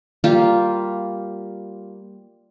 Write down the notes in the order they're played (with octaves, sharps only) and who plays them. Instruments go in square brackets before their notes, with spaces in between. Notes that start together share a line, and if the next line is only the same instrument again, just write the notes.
[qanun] G3 A#3 F4 G4